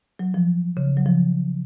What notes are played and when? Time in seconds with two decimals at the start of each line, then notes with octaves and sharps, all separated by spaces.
0.19 F#3
0.34 F3
0.77 C#3
0.97 F#3
1.06 F3